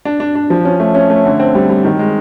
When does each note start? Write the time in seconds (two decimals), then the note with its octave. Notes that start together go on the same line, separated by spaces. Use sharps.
0.05 D4
0.20 D4
0.35 D4
0.50 F3
0.65 C#4
0.80 A3
0.95 C#4
1.10 A3
1.25 D3
1.40 C4
1.55 G3
1.70 G3
1.85 D#3
1.99 G#3